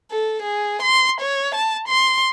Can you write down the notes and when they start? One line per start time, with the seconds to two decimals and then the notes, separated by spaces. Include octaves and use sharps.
0.11 A4
0.42 G#4
0.82 C6
1.21 C#5
1.55 A5
1.88 C6